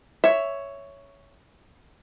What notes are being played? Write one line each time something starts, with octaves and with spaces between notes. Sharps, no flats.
C#5 E5